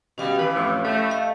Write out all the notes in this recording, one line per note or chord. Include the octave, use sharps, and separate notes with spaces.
B2 G3 C#4 F5
E3 B4
F2 A2
A2 A3
D#5 F5